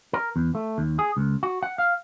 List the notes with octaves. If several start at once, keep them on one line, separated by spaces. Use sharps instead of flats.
A#4
E2
A3
D#2
G#4
C#2
F#4
F#5
F5